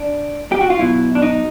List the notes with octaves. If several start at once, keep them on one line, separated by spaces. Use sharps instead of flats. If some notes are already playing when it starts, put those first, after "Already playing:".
Already playing: D4
G4
F#4
F4
B1 B2 F#3 E4
D4
D#4